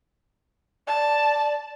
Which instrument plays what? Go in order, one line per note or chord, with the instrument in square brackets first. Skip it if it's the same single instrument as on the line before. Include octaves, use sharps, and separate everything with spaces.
[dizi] D5 [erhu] A5